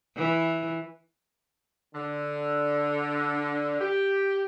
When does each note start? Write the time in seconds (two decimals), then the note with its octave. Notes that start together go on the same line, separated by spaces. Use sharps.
0.16 E3
1.94 D3
3.81 G4